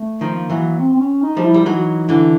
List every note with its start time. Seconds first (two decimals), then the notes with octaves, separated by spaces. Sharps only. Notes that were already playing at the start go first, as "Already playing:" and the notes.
Already playing: A3
0.21 D#3 F3
0.35 A#3
0.50 E3 F#3
0.79 C4
0.93 C4
1.00 C#4
1.22 D#4
1.37 F3 G3
1.44 E4
1.54 G3
1.65 E3 F#3 D#4
2.09 D3 E3 E4